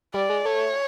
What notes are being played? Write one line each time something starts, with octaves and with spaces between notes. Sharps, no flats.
G3 D5
G#3
A3 C#5